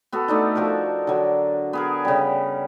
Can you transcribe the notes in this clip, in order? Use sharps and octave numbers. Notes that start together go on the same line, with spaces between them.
B3 F#4 A4
A3 D4 D#4
F3 F#4 A4 A#4
D3 F#3
B3 G#4 A#4
C#3 G3